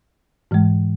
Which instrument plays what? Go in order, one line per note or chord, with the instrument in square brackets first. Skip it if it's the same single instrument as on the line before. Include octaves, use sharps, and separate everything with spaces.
[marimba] G#2 E3 G#3